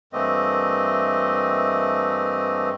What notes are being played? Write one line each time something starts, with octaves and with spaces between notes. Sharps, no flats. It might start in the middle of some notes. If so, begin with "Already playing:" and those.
G2 E3 A3 A#3 C4 D#5